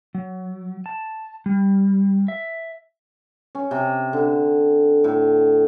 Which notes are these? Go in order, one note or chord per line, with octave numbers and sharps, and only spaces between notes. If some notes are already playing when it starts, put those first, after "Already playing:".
F#3
A5
G3
E5
C#4
C3
D3
A2